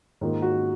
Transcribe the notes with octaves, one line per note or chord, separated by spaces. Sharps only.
G#2 D#3 A#3 F4
F#4